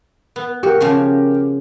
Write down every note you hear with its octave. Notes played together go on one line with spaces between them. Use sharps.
B3
F#4 G4 A#4
C#3 F3 C#4